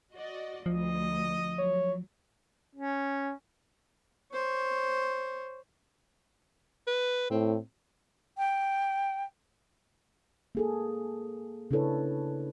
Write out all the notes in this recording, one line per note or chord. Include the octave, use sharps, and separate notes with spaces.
F#4 D5 D#5
D2 F3 D#5
F#3 C#5
C#4
C5 C#5
B4
A2 C4
G5
A#3 G#4 A4
C#3 D4 E4 A4 B4 C#5